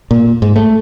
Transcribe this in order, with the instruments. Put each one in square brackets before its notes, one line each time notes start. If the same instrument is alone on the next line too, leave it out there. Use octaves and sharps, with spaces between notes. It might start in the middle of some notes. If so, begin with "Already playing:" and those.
[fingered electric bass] A#2
G#2
A3